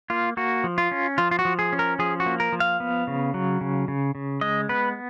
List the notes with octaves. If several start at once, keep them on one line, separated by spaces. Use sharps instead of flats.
A#3 F4
A#3 F#4
F3
F4
C#4
F3 F4
F4
F#4
F3
G#4
C#4
A#4
F3 G#4
F#4
A#3
A#4
F3
F5
B3
C#3
F#3
C#3
C#3
C#3
G#3 D#5
B3 B4